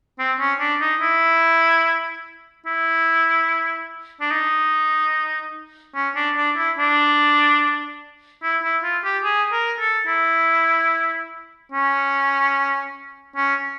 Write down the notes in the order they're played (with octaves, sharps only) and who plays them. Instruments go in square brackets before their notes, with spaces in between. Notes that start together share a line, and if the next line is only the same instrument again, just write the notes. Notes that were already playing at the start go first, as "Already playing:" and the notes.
[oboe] C4
C#4
D4
D#4
E4
E4
D4
D#4
C#4
D4
D4
E4
D4
E4
E4
F4
G4
G#4
A#4
A4
E4
C#4
C#4